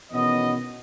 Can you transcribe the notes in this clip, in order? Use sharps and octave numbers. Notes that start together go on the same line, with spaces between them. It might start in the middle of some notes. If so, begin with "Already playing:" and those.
E2 B2 D#3 B3 C#4 D#5